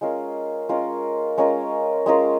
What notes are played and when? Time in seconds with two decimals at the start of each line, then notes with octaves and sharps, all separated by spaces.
0.01 G#3 C#4 F4 A#4
0.69 G#3 C#4 F4 A#4
1.38 G#3 C#4 F4 A#4
2.06 G#3 C#4 F4 A#4